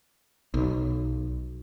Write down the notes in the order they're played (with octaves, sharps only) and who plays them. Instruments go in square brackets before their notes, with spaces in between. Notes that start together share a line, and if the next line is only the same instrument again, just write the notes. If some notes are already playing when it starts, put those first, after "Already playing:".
[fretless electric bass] B1